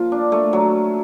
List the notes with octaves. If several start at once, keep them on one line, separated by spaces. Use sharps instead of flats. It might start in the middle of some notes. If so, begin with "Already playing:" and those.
Already playing: F3 A#3 F4
D4
A3
F#3